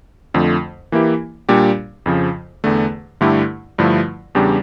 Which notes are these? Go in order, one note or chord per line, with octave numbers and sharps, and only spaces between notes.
F2 D3 F3 A3
E3 A#3 E4 G4
A#2 G3 D4 G4
F2 C#3 F3
E2 D3 A3
G2 D3 A3 E4 G4
G2 D3 F3 A3 E4
E2 C#3 G3 D4 G4